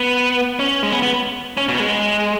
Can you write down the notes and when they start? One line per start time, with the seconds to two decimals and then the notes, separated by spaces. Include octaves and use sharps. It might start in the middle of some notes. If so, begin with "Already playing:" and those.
Already playing: B3
0.59 C#4
0.83 G#3
0.92 B3
1.03 B3
1.57 C#4
1.69 B2
1.75 B3
1.80 G#3